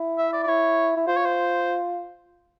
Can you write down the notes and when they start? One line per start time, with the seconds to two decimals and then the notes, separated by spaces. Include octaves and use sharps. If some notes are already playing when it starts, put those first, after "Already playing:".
Already playing: E4
0.18 E5
0.33 D5
0.43 D5
0.47 E4 C#5
0.96 E4
1.07 F4 C5
1.17 C#5
1.26 C5